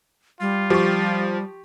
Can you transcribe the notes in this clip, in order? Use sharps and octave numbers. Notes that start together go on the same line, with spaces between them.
G3 F4
F3 G4 C#6